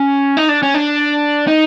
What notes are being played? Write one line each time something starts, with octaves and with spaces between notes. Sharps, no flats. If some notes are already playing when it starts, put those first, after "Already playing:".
Already playing: C#4
D#4
D4
C#4
D4
D#4